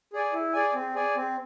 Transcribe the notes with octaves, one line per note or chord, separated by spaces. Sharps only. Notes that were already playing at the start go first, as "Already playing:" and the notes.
G#4 D5 G#5
E4
G#4 D5 G#5
C4
G#4 D5 G#5
C4